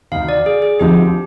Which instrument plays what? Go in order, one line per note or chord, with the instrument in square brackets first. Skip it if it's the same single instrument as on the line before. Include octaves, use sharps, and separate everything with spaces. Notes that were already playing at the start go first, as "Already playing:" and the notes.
[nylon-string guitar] D2 C3 D#3 [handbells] F5
[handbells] D5
G#4
G#4
[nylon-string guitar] D2 D3 F3 C4 D#4 [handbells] G4